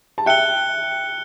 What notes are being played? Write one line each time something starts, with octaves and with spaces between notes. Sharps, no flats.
A5
E5 G5 F#6 C#7 G7